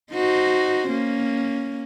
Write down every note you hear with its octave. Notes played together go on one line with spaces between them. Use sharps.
D#4 F#4 C5
A#3 C#4